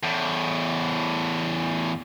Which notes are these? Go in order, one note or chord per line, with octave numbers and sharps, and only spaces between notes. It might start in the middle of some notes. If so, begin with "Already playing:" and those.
E2 A2